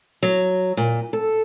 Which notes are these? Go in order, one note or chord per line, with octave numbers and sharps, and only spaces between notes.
F#3
A#2
A4